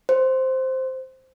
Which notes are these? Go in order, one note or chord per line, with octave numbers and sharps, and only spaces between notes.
C5